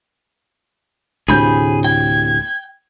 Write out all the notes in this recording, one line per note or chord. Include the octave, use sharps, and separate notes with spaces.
D2 A2 C3 G#4 B5 G6
G5 G#6